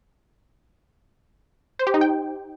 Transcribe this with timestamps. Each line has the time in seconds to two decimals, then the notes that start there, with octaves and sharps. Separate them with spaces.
1.79 C5
1.87 G4
1.94 D#4
2.01 G5